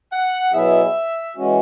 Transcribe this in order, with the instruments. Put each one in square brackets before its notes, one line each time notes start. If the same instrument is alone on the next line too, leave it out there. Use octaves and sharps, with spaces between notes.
[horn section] F#5
[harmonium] B2 F#3 B3 E4 G#4 [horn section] E5
[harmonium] E3 G#3 C#4 F#4